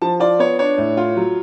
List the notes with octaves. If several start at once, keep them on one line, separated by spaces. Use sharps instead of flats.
F3 A5
F4 D5
B3 C#5
D4 C#5
A2
F4
F#3